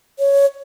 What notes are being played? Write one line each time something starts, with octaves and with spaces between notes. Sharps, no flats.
C#5